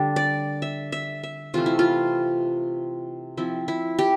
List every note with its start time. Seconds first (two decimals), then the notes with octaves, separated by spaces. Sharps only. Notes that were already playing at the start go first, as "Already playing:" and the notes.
Already playing: D3 G3 D4 G4
0.16 D5
0.62 E5
0.92 E5
1.23 E5
1.54 C3 E3 A3 F4
1.66 E4
1.79 F4
3.37 F3 C4 E4
3.68 E4
3.99 G4